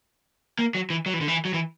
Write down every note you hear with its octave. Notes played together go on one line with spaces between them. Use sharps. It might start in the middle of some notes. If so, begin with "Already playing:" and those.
A#3
F#3
E3
F#3
E3
D3
E3
F#3
E3